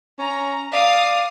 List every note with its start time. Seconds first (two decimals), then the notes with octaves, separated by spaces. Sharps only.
0.19 C#4 A#5
0.73 D5 F5 D#6